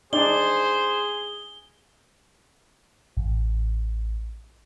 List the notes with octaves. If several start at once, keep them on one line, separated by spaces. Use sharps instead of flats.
D4 D#4 G#4 C5 D5 G7
A1